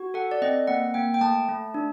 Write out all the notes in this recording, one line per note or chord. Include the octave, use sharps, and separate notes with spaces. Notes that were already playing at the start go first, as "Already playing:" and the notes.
Already playing: F#4
A4 F#5
D5
C4 D#5
A#3 F#5
A#3 G5
G5
A3 A5
A3
D4